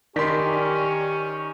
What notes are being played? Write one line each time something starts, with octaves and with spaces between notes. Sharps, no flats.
D#3 C#4 G4 A#4 D5 C6 B6